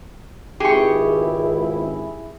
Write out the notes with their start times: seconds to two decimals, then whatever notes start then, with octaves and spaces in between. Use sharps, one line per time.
0.60 G#1 C#2 E4 G4 G#4 C#6